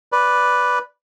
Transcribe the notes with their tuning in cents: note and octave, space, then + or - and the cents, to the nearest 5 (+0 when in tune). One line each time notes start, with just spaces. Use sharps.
B4 +0 D5 -5